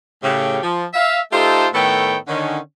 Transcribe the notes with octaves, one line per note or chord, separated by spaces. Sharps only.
A2 C#3 G4
F3
E5 F5
A3 D#4 F4 G4 A4 C5
A2 D#3 B3 A4 C#5 G5
D3 D#3 C#4